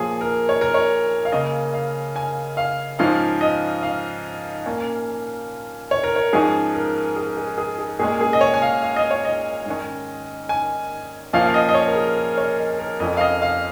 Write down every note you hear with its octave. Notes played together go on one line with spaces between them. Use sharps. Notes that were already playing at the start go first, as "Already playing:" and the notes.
Already playing: A#2 F3 A#3 G#4 C#5
A#4
C#5
A#4
C#5
F5
C#3 A#3 C#4 D#5
F5
G#5
F5
G#2 F3 C#4 F5
D#5
F5
A#2 A#3 C#4
C#5
A#4
C#5
G#2 F3 C#4 G#4
A#4
G#4
G#4
G#4
G#4
A#2 G#3 C#4 G#4
G#4
D#5
C#5
G#5
F5
F5
D#5
C#5
D#5
G#2 D#3 C#4
G#5
A#2 F3 C#4 F5
F5
D#5
D#5
C#5
A#4
G#4
A#4
C#5
D#5
A#4
F2 F3 C#4 D#5
F5
D#5
F5